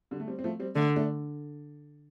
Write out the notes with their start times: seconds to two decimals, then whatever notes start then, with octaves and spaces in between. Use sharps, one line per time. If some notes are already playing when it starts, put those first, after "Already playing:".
0.11 D3 G3
0.20 A3
0.28 G3 C4
0.39 C4
0.44 F3 A3
0.59 G3 C4
0.75 D3 A3 D4
0.96 A3 D4